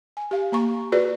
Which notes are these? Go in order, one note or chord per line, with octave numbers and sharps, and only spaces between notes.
G#5
G4 F5
A#3 A#5 C#6
F4 F#4 G#4 B4 D5